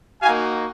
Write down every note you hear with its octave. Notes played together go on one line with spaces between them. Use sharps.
A#3 D#4 F#4 F5 G#5